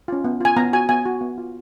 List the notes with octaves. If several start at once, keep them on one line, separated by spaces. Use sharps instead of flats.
C#4 F4
B3
F4 G#5
B3 A#5
F#4 G#5
B3 G#5
F#4
B3
F4